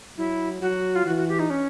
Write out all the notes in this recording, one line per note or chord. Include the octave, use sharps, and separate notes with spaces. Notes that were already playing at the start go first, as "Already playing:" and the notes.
F#3 E4
F#3 F#4
F4
E3 F#4
F#4
G4
D#4
C#4